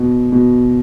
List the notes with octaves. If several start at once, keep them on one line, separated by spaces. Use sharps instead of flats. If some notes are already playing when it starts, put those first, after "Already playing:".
Already playing: B2
B2